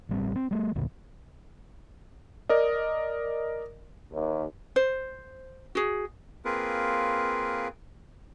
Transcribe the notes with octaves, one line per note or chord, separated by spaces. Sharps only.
A1 G3 C4
C4
G3 A3
B1 E2 A#2 D3
A#4 D5 D#5
D#2
C5
F#4 G#4
A#3 C4 F4 G#4 A#4 B4